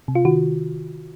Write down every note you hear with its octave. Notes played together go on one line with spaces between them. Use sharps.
C3
F4
D#3 F#4